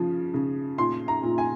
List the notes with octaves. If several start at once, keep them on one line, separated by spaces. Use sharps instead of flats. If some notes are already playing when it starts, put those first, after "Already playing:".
Already playing: C#3 F3
C#3
A#2 C6
A#5
A#2
G#5